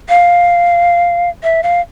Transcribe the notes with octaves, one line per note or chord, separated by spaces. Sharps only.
F5
E5
F5